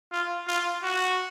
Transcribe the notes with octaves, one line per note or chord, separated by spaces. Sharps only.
F4
F4
F#4